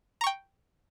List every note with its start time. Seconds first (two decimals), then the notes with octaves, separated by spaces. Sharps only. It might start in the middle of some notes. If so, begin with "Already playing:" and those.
0.21 A#5
0.24 C#6
0.27 G5